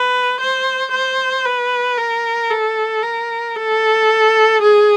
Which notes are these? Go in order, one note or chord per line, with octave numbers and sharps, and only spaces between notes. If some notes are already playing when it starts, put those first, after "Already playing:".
Already playing: B4
C5
C5
B4
A#4
A4
A#4
A4
G#4